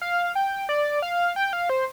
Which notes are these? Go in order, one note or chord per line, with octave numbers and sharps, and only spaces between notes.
F5
G5
D5
F5
G5
F5
C5